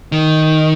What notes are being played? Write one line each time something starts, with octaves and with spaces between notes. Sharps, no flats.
D#3